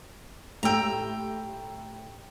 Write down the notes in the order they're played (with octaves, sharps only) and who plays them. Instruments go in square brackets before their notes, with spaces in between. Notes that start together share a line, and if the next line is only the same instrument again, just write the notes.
[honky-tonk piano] A2 G4 E6 [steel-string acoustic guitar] G5 A#5